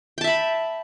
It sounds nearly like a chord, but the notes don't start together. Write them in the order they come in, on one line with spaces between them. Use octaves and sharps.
G5 A5 E5 B5